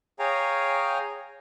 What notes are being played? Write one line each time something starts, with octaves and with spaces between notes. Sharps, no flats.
G#4 C#5 F5 G5 G#5 A#5